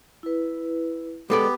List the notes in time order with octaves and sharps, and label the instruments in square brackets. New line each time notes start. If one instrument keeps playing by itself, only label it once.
[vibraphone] E4 B4
[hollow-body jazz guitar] G#3 A4 D5 [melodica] B3 G4